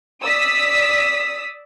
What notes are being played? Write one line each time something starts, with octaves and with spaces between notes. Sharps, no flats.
D5 D#6 E6 B6